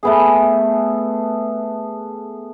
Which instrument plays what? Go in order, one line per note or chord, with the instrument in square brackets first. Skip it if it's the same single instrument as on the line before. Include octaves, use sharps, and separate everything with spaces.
[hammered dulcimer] A3 B3 G#4